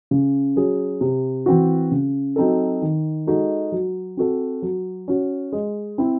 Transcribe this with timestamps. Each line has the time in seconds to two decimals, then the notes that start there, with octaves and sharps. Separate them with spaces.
0.11 C#3
0.56 F#3 C#4 G#4
1.01 C3
1.46 E3 C4 F#4
1.92 C#3
2.36 F#3 C4 D#4 A4
2.82 D#3
3.27 G#3 D#4 F#4 A4
3.72 F#3
4.17 C4 F#4 A4
4.62 F#3
5.08 C#4 F#4
5.52 G#3
5.98 C4 E4